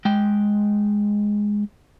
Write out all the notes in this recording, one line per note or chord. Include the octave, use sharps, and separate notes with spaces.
G#3 G5